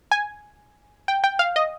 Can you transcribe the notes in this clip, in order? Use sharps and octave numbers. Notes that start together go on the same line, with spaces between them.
G#5
G5
G5
F5
D#5